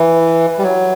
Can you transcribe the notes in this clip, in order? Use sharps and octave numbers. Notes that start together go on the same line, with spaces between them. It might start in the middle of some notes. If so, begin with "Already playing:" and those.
Already playing: E3
G3
F#3